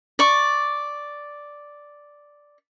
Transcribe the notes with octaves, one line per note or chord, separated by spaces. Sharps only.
D5 C#6